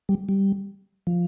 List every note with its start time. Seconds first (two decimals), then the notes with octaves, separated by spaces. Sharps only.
0.09 G3
0.29 G3
1.07 F3